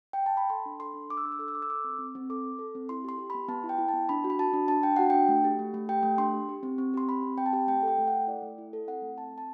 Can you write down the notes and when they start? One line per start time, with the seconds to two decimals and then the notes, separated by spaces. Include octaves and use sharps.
0.13 G5
0.26 A5
0.37 B5
0.50 A4 C6
0.66 D4
0.79 A4 C6
0.94 D4
1.09 D4 D6
1.17 E6
1.24 D4 D6
1.32 E6
1.39 A4 D6
1.48 E6
1.55 A4 D6
1.62 E6
1.70 A4 D6
1.84 C4
1.99 C4
2.15 C4
2.30 A4 D6
2.45 A4
2.59 A4
2.75 C4
2.89 E4 C6
3.04 G4 C6
3.19 G4
3.30 B5
3.35 B3
3.49 B3 A5
3.63 E4
3.69 G5
3.78 E4
3.88 A5
3.93 B3
4.09 D4 B5
4.24 F#4
4.30 B5
4.39 F#4 A5
4.53 D4
4.68 D4 A5
4.83 D4 G5
4.96 F#4 F#5
5.10 D4 G5
5.28 A3
5.44 G4
5.59 A3
5.74 A3
5.89 G4 G5
6.03 A3
6.18 D4 C6
6.34 G4
6.49 G4
6.63 C4
6.78 C4
6.94 G4 C6
7.09 C4 B5
7.23 C4
7.37 C4 G5
7.46 A5
7.53 G4 G5
7.67 A3 G5
7.83 A4
7.88 G5
7.98 A3
8.08 F#5
8.12 A4
8.27 E4 D5
8.42 A3
8.58 E4
8.73 A4
8.88 C4 F#5
9.02 A3
9.18 C4 A5
9.32 C4
9.38 A5